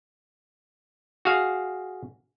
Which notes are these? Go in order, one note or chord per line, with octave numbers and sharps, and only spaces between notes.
F#4 G#4 F5